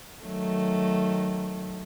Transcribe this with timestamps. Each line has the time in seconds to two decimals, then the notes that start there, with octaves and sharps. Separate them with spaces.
0.24 D#3 F#3 A3